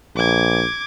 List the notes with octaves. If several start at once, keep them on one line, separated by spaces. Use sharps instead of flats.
A#1 D6 G#6